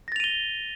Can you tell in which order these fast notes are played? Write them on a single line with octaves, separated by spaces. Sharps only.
A#6 A6 F7 D#7 G7